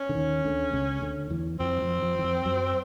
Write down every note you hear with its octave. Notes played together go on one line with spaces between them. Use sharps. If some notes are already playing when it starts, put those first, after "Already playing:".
Already playing: C#4
D3
D#2 D#3
D2 D3
C#2 C#3
D2 D3
E2 E3
F2 F3 C4
F2 F3
F2 F3
E3
F2 F3
F#2 F#3